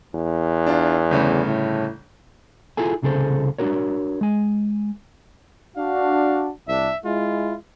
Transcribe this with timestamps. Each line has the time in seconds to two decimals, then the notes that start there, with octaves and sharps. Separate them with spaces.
0.15 E2
0.66 D4 F4
1.11 G1 C#3 A3
1.46 A2
2.77 E4 F4 G#4 A4 G#5
3.02 C2 C#3 G#4 A4 C5
3.58 D4 F4 F#4 A#4 C#5
4.21 G#3 G#5
5.77 D4 F#4 F5
6.68 C2 D4 E5
7.05 G#3 E4 F4